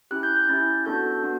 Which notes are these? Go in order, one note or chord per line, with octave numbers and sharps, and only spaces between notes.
C#4 E4 G4 F#6
G6
G6
C#4 E4 G4 A6
B3 D4 F#4 A4 G6
B3 D4 F#4